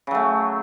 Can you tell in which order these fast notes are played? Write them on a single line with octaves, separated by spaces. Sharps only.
C#3 F#3 A3